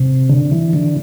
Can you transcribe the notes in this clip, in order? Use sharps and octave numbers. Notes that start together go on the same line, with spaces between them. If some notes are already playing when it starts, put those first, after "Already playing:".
Already playing: C3
D3
E3
D3